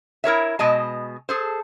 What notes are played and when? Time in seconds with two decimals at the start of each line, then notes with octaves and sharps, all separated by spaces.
0.24 E4 A#4 C#5 E5
0.59 B2 G#3 D#5 A5
1.29 G#4 A4 C5